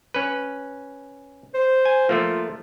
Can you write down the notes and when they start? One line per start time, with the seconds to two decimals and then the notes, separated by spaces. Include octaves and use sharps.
0.14 C#4 B4
1.54 C5
1.85 G#5
2.09 F3 A3 A#3 F4